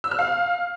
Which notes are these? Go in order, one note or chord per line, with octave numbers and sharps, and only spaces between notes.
E6
F6
F5